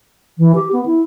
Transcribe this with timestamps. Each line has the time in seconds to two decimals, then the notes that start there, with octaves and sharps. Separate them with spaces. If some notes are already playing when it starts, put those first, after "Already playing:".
0.38 E3
0.55 G4
0.73 B3
0.86 E4